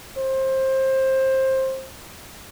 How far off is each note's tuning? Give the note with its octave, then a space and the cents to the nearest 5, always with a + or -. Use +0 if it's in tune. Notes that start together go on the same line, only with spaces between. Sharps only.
C5 +20